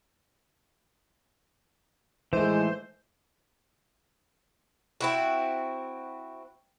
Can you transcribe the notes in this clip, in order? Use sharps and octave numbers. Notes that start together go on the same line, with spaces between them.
A2 D#3 E3 G#3 A3 C5
C4 E4 F#4